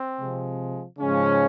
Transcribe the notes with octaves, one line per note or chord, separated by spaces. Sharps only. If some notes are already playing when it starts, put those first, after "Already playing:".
Already playing: C4
C3 F3 G#3
G#2 C#3 F3 G#3 C#4